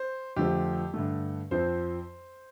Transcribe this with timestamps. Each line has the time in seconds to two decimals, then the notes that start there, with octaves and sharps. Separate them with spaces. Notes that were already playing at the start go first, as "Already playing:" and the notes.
Already playing: C5
0.36 F2 D3 F3 A3 C4 G4
0.94 G2 D3 A3
1.51 F2 F3 C4 C5